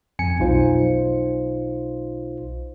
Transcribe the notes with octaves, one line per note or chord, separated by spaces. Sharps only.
F2 G#5 C#7
B1 D#4 F4 C5